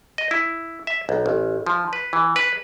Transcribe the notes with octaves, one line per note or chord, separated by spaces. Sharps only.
D#5
E4
E5
B1
A1
F3
B4
E3
B4